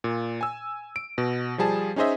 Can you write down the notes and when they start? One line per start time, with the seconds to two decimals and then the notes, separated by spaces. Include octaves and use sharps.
0.04 A#2
0.41 G#5 E6
0.96 D7
1.18 B2
1.58 F3 G3 G#4 A5
1.96 C#4 D#4 G#4 C5 D#5 E5